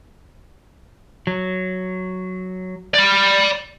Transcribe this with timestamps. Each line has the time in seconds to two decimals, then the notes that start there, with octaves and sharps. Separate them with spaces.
1.27 F#3
2.94 D5 B5